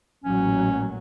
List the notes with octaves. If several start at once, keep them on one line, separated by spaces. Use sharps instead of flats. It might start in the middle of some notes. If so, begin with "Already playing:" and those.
A1 A#2 F#3 C#4